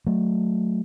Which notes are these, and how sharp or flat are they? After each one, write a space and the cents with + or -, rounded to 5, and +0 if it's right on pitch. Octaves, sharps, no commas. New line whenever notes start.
F#3 +0 A3 +0